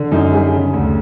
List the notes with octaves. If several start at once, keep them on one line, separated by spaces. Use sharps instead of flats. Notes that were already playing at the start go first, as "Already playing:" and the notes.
Already playing: D3
F#2 D#4
G3 G#4
C#3
D2